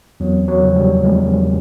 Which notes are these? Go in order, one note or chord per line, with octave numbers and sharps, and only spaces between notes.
E2 F#3
F#3
C#3 F3
G3
E2 G#3